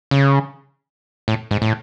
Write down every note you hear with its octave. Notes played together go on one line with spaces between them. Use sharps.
C#3
A2
G#2
A2